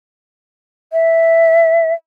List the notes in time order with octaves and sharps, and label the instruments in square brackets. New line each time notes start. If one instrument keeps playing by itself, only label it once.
[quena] E5